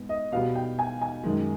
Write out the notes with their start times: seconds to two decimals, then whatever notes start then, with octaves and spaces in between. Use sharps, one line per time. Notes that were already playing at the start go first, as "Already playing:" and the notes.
Already playing: G#2 B3
0.09 D#5
0.32 B2 G3 B3 F5
0.55 G5
0.79 G#5
1.01 G#5
1.24 F#2 D#3 G#3